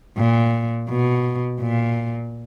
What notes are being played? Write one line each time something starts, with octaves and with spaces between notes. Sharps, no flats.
A#2
B2
A#2